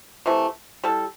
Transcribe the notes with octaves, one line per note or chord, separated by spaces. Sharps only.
C3 E3 A3
G3 E4 A4